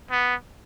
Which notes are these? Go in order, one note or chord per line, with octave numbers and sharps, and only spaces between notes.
B3